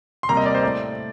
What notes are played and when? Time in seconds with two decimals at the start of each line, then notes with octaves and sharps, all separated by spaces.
0.23 C6
0.29 C3 G3 A#3 A#5
0.37 D#5
0.46 D5
0.55 C5
0.63 A2 A3 D5